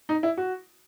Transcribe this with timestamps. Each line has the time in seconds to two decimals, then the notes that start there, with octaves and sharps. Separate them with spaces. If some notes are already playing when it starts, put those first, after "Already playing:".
0.09 D#4
0.23 E4
0.37 F#4